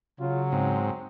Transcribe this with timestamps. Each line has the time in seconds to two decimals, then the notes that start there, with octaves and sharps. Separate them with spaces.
0.20 C#3 F#3 F4
0.52 G#2 C4